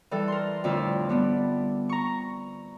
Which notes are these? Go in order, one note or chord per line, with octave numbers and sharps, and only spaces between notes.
E3 G3 A4
A#4 C6
F2 A2 D3 F4 E5
G3 B3 D4
A#5 C#6